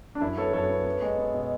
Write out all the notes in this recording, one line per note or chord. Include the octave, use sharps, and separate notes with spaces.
D4
F#2 E4
B3 A4 C#5
F#2 A4 C#5
B3
B3
G#3
B3
B2